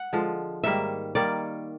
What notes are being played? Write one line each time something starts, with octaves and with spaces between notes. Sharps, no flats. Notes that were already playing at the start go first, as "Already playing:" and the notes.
Already playing: F#5
D3 F3 G#3
G#2 D#3 G3 A#3 E5
D#3 G3 A#3 D5